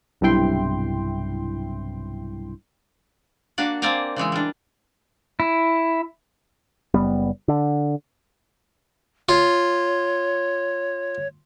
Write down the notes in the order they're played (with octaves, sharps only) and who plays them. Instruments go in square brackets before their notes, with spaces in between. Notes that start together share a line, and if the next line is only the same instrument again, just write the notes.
[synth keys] B1 G2 C3 E4 G5 C6
[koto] A#3 D4 F#4 D5
A#3 C4 D5 G5 G#5 A#5
C#3 E3 G#3 E4
G3 D4
[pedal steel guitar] E4
[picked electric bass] F#1 G3 B3
D3
[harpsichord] F4 [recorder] C#5